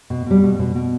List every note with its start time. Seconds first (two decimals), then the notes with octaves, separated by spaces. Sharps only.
0.10 B2
0.26 B2 G3
0.43 B2
0.59 B2
0.75 B2